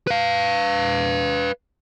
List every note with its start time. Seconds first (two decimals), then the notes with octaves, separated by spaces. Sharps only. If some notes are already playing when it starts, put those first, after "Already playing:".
0.07 B4 F5